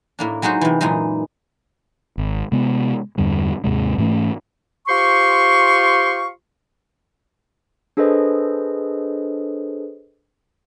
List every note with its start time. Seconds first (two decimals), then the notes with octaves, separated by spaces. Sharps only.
0.19 A2 A#3 D4
0.42 F#3 G#3 D#4 F#4 C5
0.61 C3 E3
0.81 F#2 A#2 E3 G#3 D#4
2.18 G#1
2.52 C3 G#3 B3
3.18 E2 G2 D3 G3
3.64 D#2 G#2 C3 G#3
3.98 G#2 E3 A3 C#4
4.88 F4 G4 C5 C6 C#6
7.97 D4 G#4 A4 B4 C5 D#5